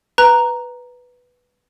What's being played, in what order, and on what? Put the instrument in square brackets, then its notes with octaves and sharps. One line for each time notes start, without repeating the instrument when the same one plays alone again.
[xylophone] B4 A#5 F#6